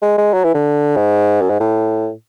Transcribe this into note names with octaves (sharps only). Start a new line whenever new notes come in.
G#3
G#3
F#3
E3
D3
G#2
F#2
G#2
A2